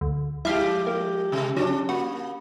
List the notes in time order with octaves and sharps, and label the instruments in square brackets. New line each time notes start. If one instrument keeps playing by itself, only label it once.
[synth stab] D2
[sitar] F3 G#3 G4 [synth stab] E4 F5
[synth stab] A#3
[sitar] C3 G#3
[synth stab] C#3 F#3 [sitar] C#4 D4
[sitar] A#3 [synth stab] F#4